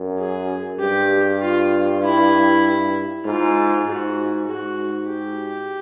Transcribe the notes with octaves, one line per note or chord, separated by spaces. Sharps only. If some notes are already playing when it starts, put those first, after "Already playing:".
Already playing: F#2
G#4
G2 G4
F4
E4
G#2 F4
G#2 F#4
G#2 F#4
G4